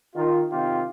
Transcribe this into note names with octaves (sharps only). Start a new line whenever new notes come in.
D#3 F4
C3 D#3 D#4 F4 G4